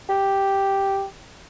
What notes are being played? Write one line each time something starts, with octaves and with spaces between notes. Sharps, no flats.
G4